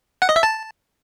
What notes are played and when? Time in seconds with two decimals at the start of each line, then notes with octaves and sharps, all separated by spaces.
0.22 F#5
0.29 D#5
0.36 E5
0.43 A5